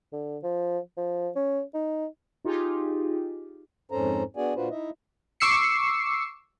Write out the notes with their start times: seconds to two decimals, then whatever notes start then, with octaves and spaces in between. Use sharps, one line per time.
0.12 D3
0.43 F3
0.97 F3
1.36 C#4
1.74 D#4
2.45 D#4 F4 G4 G#4
3.91 F2 G#2 C#4 A4 C5 A#5
4.36 B3 D4 F#4 G#4 D5 G#5
4.55 A#2 D4 F4 F#4 B4 C5
4.70 D#4 E4 D#5 E5
5.40 C#6 D6 E6 C7 C#7